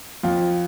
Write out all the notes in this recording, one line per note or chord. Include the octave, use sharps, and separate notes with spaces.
F2 F4